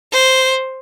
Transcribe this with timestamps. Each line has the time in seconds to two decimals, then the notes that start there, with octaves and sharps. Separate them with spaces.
0.12 C5